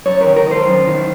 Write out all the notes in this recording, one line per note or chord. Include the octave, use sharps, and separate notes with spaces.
F#2 C#5
D#3 A#4
A#4
D#3
C5
F#2
D#3